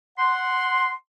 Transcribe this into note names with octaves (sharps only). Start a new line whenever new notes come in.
F#5 C6